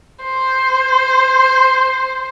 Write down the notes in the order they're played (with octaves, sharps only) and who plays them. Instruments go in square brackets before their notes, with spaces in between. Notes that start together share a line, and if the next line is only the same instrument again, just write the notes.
[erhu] C5